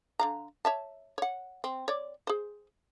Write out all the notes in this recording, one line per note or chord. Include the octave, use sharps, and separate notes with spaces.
D3 F5 A#5
C#5 E5 A5
C#5 F#5
C4
C#5 D5
G#4 C5